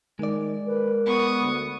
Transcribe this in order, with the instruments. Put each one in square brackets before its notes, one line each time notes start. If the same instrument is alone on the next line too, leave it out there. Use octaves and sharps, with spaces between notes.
[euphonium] D#3 [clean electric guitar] G#3 D5
[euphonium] A#4 [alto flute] B4
[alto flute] B3 [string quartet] C#6 D#6
[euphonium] D2